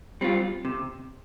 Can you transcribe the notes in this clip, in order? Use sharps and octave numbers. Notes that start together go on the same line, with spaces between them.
G3 C4 F4
C3